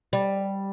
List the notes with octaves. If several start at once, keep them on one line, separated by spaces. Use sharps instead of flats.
G3